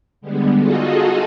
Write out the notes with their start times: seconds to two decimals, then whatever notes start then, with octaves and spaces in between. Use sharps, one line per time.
0.21 D3 G3 G#3 B3
0.56 D#4 F4 F#4 G#4 A4 D#5